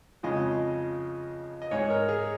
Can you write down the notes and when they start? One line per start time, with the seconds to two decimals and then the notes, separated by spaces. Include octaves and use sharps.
0.23 F2 C#3 F3 G#3 D#5
1.62 D#5
1.71 G#2 G#3 C#5
1.90 A#4
2.09 G#4